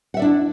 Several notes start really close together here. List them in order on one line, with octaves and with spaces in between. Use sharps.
F#5 E5 D5 D4 E4